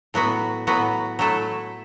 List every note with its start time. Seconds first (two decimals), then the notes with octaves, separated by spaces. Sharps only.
0.14 A2 F#3 B3 F#4
0.67 A2 F#3 B3 F#4
1.19 F#3 A3 E4 A4